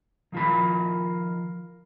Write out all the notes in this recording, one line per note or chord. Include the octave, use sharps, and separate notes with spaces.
D#3 F3 F4 A#4 B5